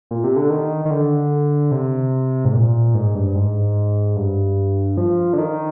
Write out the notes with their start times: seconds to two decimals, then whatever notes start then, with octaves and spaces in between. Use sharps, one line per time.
0.11 A#2
0.24 C3
0.36 D3
0.50 D#3
0.85 D#3
0.91 D3
1.71 C3
2.45 G#2
2.53 A#2
2.94 G#2
3.15 G2
3.35 G#2
4.16 G2
4.97 F3
5.33 D3
5.38 D#3